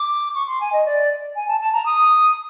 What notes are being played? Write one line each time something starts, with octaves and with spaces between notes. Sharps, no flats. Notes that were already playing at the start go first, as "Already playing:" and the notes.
Already playing: D6
C#6
C6
G#5
D#5
D5
G#5
A5
A5
A#5
D#6